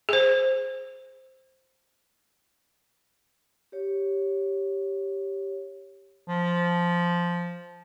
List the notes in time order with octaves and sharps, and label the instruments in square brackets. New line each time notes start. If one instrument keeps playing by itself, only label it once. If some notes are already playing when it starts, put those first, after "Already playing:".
[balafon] G#4 C5
[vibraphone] G4 C#5
[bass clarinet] F3